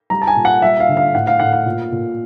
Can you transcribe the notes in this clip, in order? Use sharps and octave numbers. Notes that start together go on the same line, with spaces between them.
G3 A#5
A5
G#5
A#2
F#5
G3 E5
F5
D3
F5
A2 F#5
F5
A2 F#5
F5
A#2
A#2